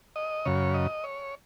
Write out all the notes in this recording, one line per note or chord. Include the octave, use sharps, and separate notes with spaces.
D#5
F#2 C#3 C#5
D#5
C#5